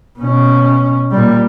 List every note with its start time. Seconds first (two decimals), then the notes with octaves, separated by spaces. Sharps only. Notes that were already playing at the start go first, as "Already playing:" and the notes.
0.19 B2 C#4
1.11 A#2 G3